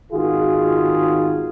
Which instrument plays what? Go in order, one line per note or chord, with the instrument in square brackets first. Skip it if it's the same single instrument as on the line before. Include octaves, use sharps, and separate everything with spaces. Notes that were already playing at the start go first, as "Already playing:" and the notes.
[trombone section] G#1 D#3 F4 F#4 G#4